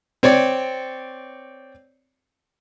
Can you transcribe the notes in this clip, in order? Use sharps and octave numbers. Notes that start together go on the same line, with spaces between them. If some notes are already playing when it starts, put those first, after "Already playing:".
C4 C#5 D5